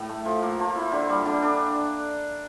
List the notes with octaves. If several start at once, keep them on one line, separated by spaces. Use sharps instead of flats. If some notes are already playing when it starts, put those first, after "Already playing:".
Already playing: A2
A3
F3
A#3
F3
E4
D3
G3
D3
D4